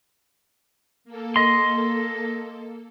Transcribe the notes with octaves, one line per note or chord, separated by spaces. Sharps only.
A#3 A4
D#5 C6